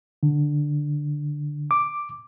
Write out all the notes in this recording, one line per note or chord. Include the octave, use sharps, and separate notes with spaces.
D3
D6